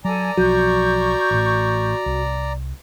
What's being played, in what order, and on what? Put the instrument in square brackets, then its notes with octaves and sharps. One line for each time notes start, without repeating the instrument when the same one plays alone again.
[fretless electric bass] F#3 [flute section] A4 G#5 [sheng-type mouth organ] D5 A#5
[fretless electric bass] B1 F3 F#3 [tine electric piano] F#4 [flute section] C#6 G6
[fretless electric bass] A1 A2
C2